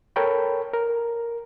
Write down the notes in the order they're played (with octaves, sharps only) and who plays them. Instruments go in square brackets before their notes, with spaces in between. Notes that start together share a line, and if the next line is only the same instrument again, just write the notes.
[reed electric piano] A4 A#4 C#5 G5 B5
A#4